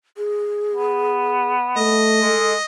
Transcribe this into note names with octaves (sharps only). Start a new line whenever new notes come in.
G#4
B3
A3 D#5
G#3 A4